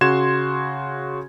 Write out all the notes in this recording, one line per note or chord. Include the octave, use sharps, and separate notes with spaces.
C#3 F#4 C6 G#6 E7